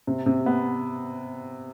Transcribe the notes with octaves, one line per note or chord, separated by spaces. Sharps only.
C3
C3
B3